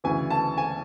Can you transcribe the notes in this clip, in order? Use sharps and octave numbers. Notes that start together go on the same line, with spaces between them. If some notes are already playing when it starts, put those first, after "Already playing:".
D2 C#3 E3 G#5
A5
G#5